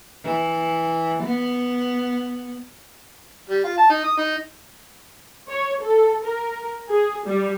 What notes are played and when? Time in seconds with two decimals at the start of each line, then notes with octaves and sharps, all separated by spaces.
0.24 E3
1.23 B3
3.49 G3
3.64 F4
3.78 A5
3.90 D#4
4.04 D#6
4.18 D#4
5.48 C#5
5.82 A4
6.25 A#4
6.89 G#4
7.26 G3